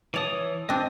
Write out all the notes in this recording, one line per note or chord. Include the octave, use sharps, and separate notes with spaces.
E3 C#5 D5 A5 D#6
C4 D4 D#5